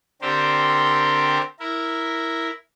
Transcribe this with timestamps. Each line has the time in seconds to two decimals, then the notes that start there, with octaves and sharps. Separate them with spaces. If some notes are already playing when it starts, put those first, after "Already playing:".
0.22 D3 C4 G4 A#4 C5
1.59 E4 A#4